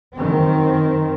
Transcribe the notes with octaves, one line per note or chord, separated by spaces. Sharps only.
F#2 D#3 C4